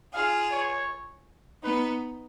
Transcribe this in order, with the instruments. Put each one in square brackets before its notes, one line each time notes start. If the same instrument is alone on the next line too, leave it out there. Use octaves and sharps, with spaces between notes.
[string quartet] F4 G#4 [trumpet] F5
[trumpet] C#5
[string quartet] B3 D#4 [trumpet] B4